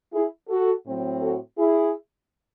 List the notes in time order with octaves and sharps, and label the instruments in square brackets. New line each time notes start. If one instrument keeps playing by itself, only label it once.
[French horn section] E4 G#4
F#4 A4
A2 F#3 C4
F#4 A4
E4 G#4